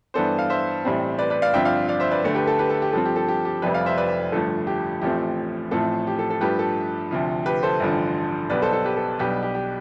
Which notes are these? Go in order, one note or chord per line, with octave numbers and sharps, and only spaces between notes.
G2 E3 B3 D4 A4 C5
F5
C5 E5
A1 A2 G3 C4
B4 D5
B4 D5
D5 F5
G1 G2 F3 C4 E5 G5
D5 F5
D5 F5
C5 E5
B4 D5
D2 D3 A3
G4 B4
A4
G4 B4
A4
G4
G2 F3 C4 A4
G4
A4
G4
G4
F1 F2 C3 G3 B4 D5
D5 F5
C5 E5
B4 D5
G1 G2 F3 A3 A4
G4
A1 A2 F3 A3 C4 G4
A1 A2 F3 A3 C4 A4
G4
A4
A4
G2 F3 A3 G4 B4
A4
D2 C3 F3
G4 B4
A4 C5
A1 G2 D3 F3
B1 B2 G3 B4 D5
A4 C5
A4
G4 B4
A4
B1 B2 G3 D4 G4 B4
G4
G4